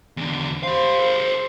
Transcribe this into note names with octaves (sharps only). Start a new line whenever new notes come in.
E2 D3
G4 C5 F5
G#4 A#4